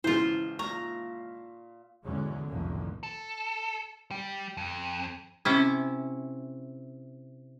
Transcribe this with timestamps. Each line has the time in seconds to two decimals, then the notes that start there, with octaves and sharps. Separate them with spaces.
0.04 G#1 C#3 E3 E4 F4 C5
0.59 A#2 E5 F5 A#5 C#6
2.04 E2 G#2 D3 F#3 G#3 C#4
2.47 C2 F2 A2 D3 D#3 A#3
3.03 A4
4.11 G3
4.57 F2
5.45 C3 C#4 E4